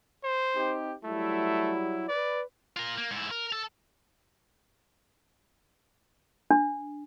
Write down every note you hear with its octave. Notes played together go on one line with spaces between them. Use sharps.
C5
C4 D#4 G4
F#3 G3 A3 E4
B4 D5
F4 A#4
A#3
G#2 E4
A#4
A4
D4